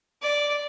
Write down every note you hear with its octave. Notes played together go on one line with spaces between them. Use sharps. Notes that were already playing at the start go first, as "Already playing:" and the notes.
D5